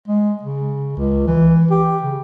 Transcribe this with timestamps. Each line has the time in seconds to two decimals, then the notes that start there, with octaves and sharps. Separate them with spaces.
0.08 G#3
0.43 C#3
0.97 C#2
1.27 E3
1.71 G4
2.02 C#3